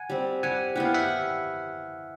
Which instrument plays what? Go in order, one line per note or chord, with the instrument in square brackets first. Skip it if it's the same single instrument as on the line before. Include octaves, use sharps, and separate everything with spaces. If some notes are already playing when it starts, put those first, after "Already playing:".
Already playing: [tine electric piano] F#5 G#5
[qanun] G3 C4
[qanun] G3 [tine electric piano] F#5 G#5
[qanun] B3 E4 G4 [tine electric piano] F#5
[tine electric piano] F5
E5 F#5